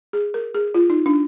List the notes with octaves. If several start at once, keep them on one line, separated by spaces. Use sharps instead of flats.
G#4
A#4
G#4
F4
D#4
D4